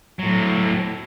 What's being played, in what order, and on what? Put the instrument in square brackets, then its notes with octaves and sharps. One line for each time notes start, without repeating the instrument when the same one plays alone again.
[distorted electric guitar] A2 F#3